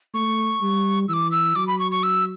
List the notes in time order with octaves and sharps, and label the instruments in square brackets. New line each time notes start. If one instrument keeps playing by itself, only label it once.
[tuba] A3 [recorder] C#6
[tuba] G3
[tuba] E3 [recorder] D6 E6
[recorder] E6
[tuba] F#3 [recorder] D6
[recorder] B5
C#6
C#6
E6